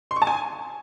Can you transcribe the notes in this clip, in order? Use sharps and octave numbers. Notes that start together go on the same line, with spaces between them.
C6
C#6
A5
G#5